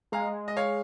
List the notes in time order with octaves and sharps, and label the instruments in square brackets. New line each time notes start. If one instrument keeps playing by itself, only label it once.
[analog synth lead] G#3 [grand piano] F5 A#5
[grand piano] D#5
C#5 F5